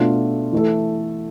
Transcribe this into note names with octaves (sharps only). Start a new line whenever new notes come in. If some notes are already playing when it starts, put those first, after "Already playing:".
Already playing: B2 A3 D4 F4 A4
E3 A3 E4 A4